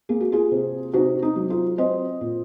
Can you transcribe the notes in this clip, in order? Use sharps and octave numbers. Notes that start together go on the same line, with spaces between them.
A#3 G#4
F#4
F4 G#4
C3
C3 D#4 F#4
D#4
F#3
F4
C4 C5 D#5
A#2